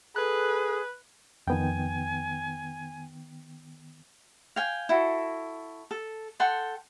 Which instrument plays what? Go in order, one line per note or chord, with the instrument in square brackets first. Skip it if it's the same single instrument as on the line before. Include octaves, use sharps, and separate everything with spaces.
[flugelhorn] G#4 [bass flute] A4 [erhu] B4 [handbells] F#6
[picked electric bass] F2 [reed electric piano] D#3 B3 G5 [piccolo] G#5
[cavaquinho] F5 G5 G#5
E4 F#4 A4
A4
A4 F#5 G5 C6